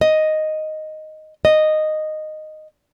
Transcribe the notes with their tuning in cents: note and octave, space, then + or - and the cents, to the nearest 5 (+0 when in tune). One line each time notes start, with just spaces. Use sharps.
D#5 +0
D#5 -10